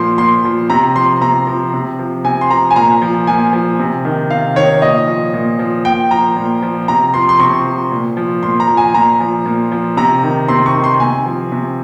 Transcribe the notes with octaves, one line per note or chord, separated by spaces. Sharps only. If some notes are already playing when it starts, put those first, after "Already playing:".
Already playing: A#2 F3 C6
A#2 C6
F3
C3 A#5
F3 C6
C3 A#5
F3
C3
F3
C3 G#5
C6
F3 A#5
G#5
A#2 A#5
F3
A#2 G#5
F3
C3
D#3
C3 F5
D#3 C#5
A#2 D#5
F3
A#2
F3
A#2 G5
F3 A#5
A#2
F3
C3 A#5
F3 C6
C6
C3 C#6
F3
A#2
F3
A#2 C6
A#5
F3
G#5
A#2 A#5
F3
A#2
F3
C3 A#5
D#3
C3 C6
C#6
D#3
C6
C3 G#5
F3
C3